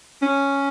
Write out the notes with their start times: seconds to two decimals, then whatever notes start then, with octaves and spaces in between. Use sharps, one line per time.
0.22 C#4